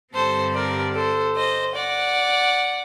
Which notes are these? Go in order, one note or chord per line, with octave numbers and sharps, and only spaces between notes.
G2 D3 G3 C4 A4 C5
A#4 D5
A4 C5
C5 D#5
D5 F#5